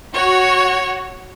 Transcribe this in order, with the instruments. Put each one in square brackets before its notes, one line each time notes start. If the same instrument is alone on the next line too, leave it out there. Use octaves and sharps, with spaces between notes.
[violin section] F#4 [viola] C#5